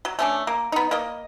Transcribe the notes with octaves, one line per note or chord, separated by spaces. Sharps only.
F#3
A3 C#4 D4
A#3
B3 D#4
A#3 D#5